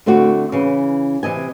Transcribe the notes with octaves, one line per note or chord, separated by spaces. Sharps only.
D3 A3 C4 E4 F#4
C#3 E3
C3 E3 D#5 G#5